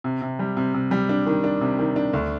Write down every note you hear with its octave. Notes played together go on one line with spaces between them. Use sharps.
C3
C3
G3
C3
C3
G3
D4
D#3
D4
C3
D#3
D4
D2